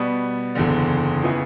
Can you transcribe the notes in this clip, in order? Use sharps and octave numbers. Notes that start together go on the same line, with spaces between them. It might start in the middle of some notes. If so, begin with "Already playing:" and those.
Already playing: B2 G3 B3
F#1 E2 D3
C#3 E3 B3 E4